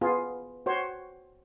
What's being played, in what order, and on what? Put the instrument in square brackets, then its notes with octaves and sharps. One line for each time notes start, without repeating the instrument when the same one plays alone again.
[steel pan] B3 F4 G#4
F#4 C5 C#5